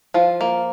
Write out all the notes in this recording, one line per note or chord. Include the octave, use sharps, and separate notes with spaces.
F3 F4
A#3